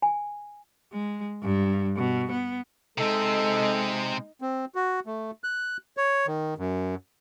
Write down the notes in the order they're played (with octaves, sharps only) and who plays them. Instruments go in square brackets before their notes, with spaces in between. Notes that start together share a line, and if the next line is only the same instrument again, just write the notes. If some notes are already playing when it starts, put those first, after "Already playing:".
[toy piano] G#5
[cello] G#3
G2
B2
B3
[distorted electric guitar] C3 C4 [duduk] G#3 [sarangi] D#4 [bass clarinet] A4
[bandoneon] C4
F#4
A3
F#6
C#5
D#3
F#2